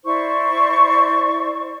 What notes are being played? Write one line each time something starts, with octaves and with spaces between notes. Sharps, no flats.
E4 C5 D5 C#6